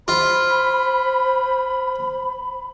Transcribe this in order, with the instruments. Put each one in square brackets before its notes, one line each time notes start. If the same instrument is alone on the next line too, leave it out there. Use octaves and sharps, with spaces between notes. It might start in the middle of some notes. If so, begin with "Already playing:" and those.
[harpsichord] F4 [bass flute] C5 [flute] B5